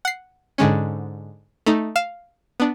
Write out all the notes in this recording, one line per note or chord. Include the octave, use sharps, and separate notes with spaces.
F#5 C7
G#2 D3 G#3 C#4
A3 D#4
F5 E7
B3 D4